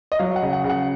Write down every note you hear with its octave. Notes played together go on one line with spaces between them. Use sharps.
D#5
F#3 F5
F#5
C#3
F#5
C#3
F#5